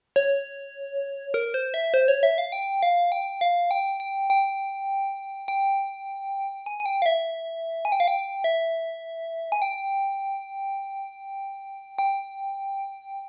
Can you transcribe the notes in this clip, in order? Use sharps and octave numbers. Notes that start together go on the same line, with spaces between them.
C#5
A#4
C5
E5
C5
C#5
E5
F5
G5
F5
G5
F5
G5
G5
G5
G5
G#5
G#5
G5
F5
E5
G#5
G5
F5
G5
E5
G#5
G5
G5